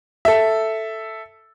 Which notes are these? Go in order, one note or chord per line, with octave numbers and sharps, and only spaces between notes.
A4 E5